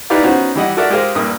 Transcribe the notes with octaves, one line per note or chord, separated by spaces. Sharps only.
D#4 E4 G4 B4 D5 F5
B3 C#4 D#4 F#4 C5
E3 G3 D#5 F#5
F#4 A4 A#4 D5 E5 F#5
G#3 G4 G#4 A#4 C5 F5
A#1 G2 A#3 D#6